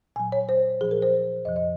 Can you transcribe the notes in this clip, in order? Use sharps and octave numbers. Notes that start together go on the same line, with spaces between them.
A#2 F#3 G#5
C#5
C5
A#2 F3 G#4
A#4
C5
F2 C3 F3 D#5
D#5